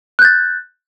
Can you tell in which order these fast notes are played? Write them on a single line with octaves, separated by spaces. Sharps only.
F#6 G6 A6